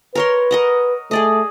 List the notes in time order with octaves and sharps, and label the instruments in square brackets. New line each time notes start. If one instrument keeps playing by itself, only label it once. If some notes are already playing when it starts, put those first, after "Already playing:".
[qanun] A#4 C#5 C6 [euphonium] B4
[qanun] A#4 D#5 F#5
[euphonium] A3 [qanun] G#4 D5 D#5